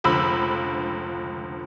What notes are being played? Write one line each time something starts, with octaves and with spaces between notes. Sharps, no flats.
F1 C#2 D3 F3 B5 E6